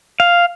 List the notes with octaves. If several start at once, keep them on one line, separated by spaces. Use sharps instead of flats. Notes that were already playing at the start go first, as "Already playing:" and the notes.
F5